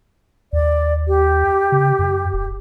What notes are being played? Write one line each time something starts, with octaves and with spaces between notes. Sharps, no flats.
D#2 D5
G4
C#3
F#2
D#1